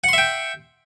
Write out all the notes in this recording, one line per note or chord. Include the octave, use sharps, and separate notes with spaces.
E5 F#5 G5 C6